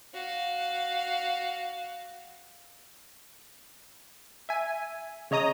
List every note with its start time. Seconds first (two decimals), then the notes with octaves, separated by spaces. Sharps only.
0.14 F#4 F5
4.49 E5 G#5
5.31 C#3 C#5 D#5 A#5 D#6